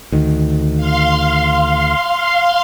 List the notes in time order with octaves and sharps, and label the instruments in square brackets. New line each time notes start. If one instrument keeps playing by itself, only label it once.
[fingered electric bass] D2 D#3
[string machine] F5 C6